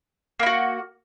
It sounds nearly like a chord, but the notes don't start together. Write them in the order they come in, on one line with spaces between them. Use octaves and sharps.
A#3 E4 F#4